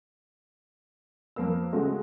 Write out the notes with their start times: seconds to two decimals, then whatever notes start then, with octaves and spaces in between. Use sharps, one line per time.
1.36 F2 A#3 B4 E6
1.72 C#3 G#3 A3 F#4 G#4